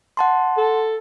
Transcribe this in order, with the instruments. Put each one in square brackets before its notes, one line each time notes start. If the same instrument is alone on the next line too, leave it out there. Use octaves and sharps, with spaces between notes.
[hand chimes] F#5 A5 C6
[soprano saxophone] A4